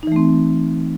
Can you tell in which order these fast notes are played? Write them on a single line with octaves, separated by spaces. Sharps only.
D#4 E3 A3 C4